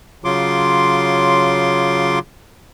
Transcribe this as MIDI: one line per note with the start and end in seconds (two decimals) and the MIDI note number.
0.24 2.19 49
0.24 2.19 54
0.24 2.19 65
0.24 2.19 84
0.24 2.19 86